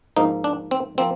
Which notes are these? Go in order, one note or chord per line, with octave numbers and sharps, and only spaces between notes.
G#2 F3 A#3 D#4
D4
C4
F3 A#3 C4